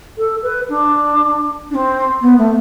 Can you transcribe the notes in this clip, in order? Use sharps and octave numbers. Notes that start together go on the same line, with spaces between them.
A4
B4
D4
D4
C4
B3
A3